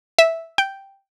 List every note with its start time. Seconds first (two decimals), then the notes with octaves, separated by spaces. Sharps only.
0.19 E5
0.58 G5